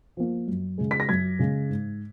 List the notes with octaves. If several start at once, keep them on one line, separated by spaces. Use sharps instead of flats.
F3 A#3
F#2
C#3 G#3
B6
A#6
F#2 G#6
C#3 G#3
G#2